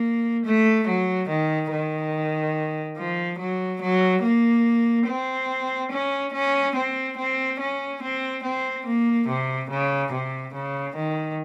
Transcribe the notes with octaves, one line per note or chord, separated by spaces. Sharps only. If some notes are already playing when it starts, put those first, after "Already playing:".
Already playing: A#3
A3
F#3
D#3
D#3
F3
F#3
F#3
A#3
C4
C#4
C#4
C4
C4
C#4
C4
C4
A#3
C3
C#3
C3
C#3
D#3